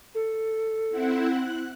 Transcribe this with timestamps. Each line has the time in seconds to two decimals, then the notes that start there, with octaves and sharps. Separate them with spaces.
0.15 A4
0.90 C4 E4 F#5
1.30 F#6